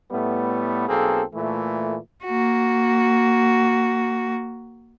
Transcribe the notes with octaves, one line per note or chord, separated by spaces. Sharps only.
A2 G3 A3 B3
B1 A#3 C4 G#4 A4
A#2 E3 A3
A#3 F#4